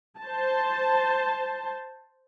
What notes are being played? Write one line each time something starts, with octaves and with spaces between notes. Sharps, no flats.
C5 A5